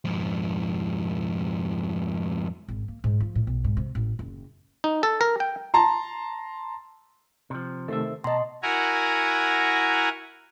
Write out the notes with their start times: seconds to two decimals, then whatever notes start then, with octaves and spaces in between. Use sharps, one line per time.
0.05 F2 G#2
2.68 G#1
2.88 A#3
3.04 G#2
3.20 F3
3.35 A2
3.47 B1
3.64 G#2
3.77 C3
3.95 A1
4.19 F#1
4.84 D#4
5.03 A4
5.21 A#4
5.40 G5
5.74 A5 A#5 C6
7.50 C3 F3
7.88 C3 D#3 A3 A4 C5 E5
8.24 B2 D#5 A5 A#5 C6
8.63 E4 F#4 A#4 F#5 G#5 A#5